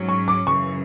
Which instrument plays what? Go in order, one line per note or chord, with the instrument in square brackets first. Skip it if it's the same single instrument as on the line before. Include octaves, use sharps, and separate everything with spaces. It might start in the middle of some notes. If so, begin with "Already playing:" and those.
Already playing: [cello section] G#2 F#3 C#4
[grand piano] C#6
D6
[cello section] F#2 C#3 E3 [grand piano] C#6